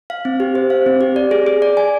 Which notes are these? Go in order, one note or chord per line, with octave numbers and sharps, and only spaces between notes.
F5
C4
G4
C5
F5
C4
G4
D5
G#4
G#4
D5
G#5